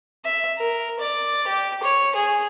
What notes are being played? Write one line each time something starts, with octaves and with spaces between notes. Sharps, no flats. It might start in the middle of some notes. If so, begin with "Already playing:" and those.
E5
A#4
D5
G4
C#5
G#4